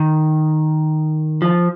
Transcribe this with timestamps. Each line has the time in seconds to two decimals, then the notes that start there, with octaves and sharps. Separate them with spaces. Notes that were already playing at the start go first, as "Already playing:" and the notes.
Already playing: D#3
1.42 F3